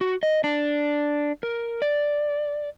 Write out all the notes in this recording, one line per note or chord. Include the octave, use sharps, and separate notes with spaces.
F#4
D#5
D4
A#4
D5